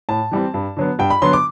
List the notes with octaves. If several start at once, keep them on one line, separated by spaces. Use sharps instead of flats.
A2 A5
E3 G3 C4
G2
D3 F#3 B3
G2 G5
B5
D3 F#3 B3 C6
D6